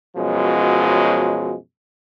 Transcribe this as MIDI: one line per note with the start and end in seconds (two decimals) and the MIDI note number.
0.16 1.57 42
0.16 1.57 47
0.16 1.57 53
0.16 1.57 54
0.16 1.57 56